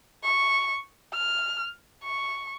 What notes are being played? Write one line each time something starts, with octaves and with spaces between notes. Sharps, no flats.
C#6
F6
C#6